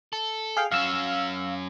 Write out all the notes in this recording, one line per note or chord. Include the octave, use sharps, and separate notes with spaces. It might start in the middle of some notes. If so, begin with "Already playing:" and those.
A4
G#4 F5 G5
F#2 C#4 F5 E6